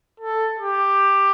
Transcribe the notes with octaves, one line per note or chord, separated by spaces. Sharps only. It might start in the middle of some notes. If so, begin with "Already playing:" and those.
A4
G4